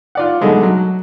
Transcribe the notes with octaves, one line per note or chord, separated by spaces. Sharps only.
F4 D5 F#5
B2 D3 F#3 G#3 A3
F#3